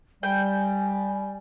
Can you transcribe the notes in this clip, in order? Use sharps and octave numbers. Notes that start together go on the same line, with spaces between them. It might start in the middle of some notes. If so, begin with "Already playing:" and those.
G3 G5 G#5